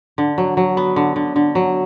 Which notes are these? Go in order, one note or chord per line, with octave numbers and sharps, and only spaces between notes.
D3
F#3
F#3
B3
D3
D3
D3
F#3